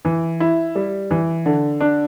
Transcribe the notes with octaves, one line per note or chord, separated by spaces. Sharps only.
E3
E4
G3
E3
D3
D4